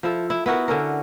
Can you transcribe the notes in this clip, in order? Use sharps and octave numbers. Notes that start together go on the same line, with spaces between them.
F3 E4 A4
E4
B3 E4 F#4 A#4
D3 C#4 A#4